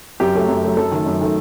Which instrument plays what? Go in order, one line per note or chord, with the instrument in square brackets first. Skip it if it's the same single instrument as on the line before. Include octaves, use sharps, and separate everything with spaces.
[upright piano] F#2 G4
F#3 A3
F#2
F#3 A3
F#2 A4
D#3 A3
F#2
D#3 A3